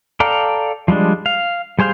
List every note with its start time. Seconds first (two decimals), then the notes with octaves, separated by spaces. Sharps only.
0.20 A4 D5 F5 G5 A#5
0.88 F3 G3 G#3 D4
1.26 F5
1.79 G3 G#4 C5 F5 G6